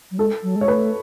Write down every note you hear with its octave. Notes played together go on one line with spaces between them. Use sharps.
F#3
G#3 A4
F#3
G#3
C#5
A3 B4